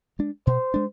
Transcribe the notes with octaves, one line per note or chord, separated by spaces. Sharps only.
G#3 D4
B2 C5
G#3 D4